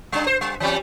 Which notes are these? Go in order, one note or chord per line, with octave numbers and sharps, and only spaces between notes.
G3 D4
C5
G3
E3 G3 C4